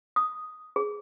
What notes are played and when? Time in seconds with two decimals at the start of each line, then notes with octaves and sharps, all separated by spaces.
0.16 D#6
0.76 G#4